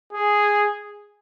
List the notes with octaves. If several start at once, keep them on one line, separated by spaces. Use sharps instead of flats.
G#4